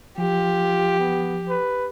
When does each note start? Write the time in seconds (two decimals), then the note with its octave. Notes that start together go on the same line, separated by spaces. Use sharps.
0.18 F3 F4 G4
0.99 B3
1.49 B4